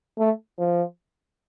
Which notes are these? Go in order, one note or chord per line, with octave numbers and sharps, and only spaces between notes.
A3
F3